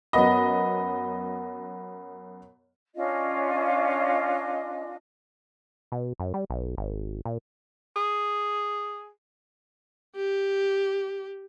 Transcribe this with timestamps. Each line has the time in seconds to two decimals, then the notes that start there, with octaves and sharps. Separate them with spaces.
0.13 F#2 B3 A#4 D#5 F#5 B5
2.95 C#4 D4 F4 D#5
5.92 B2
6.20 F#2
6.34 G3
6.50 B1
6.78 G#1
7.25 A#2
7.96 G#4
10.16 G4